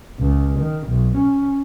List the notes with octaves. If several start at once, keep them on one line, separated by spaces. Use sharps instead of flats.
C#2
D#3
B1
C#4